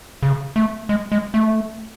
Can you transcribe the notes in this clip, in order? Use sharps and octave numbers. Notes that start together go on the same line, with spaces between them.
C#3
A3
G#3
G#3
A3